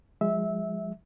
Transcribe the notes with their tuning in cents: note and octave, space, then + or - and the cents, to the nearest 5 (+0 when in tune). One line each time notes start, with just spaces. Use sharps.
F3 +25 G#3 -20 E5 -15